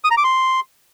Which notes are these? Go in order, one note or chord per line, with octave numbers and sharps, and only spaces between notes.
D#6
A#5
D6
C6